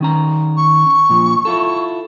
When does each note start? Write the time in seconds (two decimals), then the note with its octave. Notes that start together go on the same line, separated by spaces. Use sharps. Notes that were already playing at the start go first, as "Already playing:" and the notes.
0.01 D#3 C#4 A#5
0.57 C#6
1.10 A#2 F3
1.45 E4 F4 A4